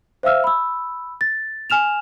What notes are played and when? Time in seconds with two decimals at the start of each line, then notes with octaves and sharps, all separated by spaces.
0.23 C5 E5 F5 E6 F6
0.44 B5 E6
1.21 A6
1.70 G#5 F6 E7 F7